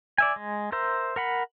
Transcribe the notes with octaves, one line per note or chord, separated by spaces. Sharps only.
D5 E5 G#5
G#3
A#4 C5 E5
A#4 F#5 B5